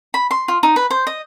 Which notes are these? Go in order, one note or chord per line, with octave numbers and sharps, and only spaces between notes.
B5
C6
F4
D#4
B4
C5
D#5